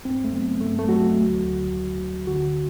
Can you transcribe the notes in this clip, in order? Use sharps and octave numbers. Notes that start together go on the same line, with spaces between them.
G2 C4
A3
F#3 B3
G2 A3
A3
F#3 F#4
D2
D2
D2
D2
D3 F#4